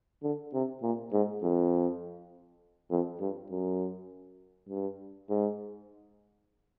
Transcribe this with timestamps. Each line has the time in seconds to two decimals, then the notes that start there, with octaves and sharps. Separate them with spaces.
0.23 D3
0.54 C3
0.82 A#2
1.13 G#2
1.43 F2
2.91 F2
3.20 G2
3.51 F#2
4.69 G2
5.29 G#2